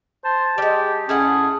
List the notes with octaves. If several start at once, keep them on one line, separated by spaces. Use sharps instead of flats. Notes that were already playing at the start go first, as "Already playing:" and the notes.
C5 A5
G3 G#3 G4
A2 A3 C#4 G#4 F#5